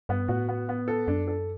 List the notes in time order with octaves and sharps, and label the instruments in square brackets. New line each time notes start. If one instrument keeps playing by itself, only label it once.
[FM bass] G2 [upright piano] B3
[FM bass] A2 [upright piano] F#4
[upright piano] B3
B3
A4
[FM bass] F#2 [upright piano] D4
[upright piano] A4